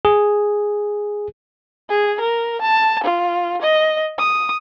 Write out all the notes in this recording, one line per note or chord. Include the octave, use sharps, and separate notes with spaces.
G#4
G#4
A#4
A5
F4
D#5
D#6